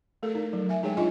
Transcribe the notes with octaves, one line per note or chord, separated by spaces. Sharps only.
A3 A4 A#4
D#4
F#3
E5 G#5
G#3 D#4 G#4 C#5 G5
D4 F4 D#5 G#5 C6